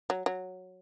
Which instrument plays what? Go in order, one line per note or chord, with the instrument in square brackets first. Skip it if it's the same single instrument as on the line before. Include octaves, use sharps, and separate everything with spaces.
[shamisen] F#3
F#3